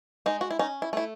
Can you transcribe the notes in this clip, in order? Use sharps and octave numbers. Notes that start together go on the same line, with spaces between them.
G#3 D#4
F#4
E4
C#4 D#4
E4
A3 E4